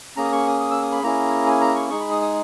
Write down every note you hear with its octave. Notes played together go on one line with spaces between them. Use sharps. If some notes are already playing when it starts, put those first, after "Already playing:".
A#3 C#4 G#4 A#5
D#6
C#6
D#6
D#6
E6
D#6
B5
A#3 C#4 E4 G#4 A#5
G#5
A#5
C#6
G#3 D#4 G#4 C#6
B5
D#6
D#6